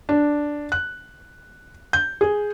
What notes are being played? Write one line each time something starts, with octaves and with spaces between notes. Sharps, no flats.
D4
F#6
G6
G#4